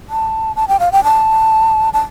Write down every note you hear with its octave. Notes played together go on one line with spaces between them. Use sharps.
A5
A5
G5
F5
G5
A5
A5